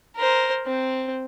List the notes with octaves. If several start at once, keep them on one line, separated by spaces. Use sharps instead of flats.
A#4 C5
C4